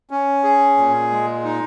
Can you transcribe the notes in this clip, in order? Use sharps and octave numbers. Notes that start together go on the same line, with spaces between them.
C#4
G#4
A#2
G#3
D#4